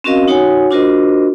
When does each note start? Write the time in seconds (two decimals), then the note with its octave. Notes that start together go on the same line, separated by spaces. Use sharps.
0.04 C4 C#4 F#4 A#4 D#5 F5
0.28 D#4 F#4 C#5 F#5 G#5
0.71 D4 F4 F#4 A#4 C5 D#5